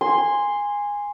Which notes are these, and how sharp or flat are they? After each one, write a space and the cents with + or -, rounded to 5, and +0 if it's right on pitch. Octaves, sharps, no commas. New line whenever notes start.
G#5 -15 C6 +0